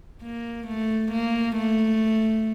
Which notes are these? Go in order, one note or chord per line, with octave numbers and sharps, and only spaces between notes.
A#3
A3
A#3
A3